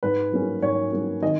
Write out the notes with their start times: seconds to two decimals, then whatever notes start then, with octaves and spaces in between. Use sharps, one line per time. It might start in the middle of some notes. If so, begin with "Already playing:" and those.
0.03 G#2 B4
0.32 F#3 A#3 C#4
0.62 G#2 C#5
0.92 F#3 A#3 C#4
1.22 D#3 D#5